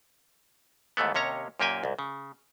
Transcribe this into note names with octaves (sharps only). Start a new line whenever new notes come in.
D#2 G#2 E3 A3 B3
D#2 C3 C#4 C#5 A#5
F#2 A#2 A#3 G4 G5 G#5
C2 G#2
C#3